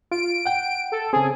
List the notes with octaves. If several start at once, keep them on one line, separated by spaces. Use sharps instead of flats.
F4 D7
F#5 G5
A4
C#3 C4 G#4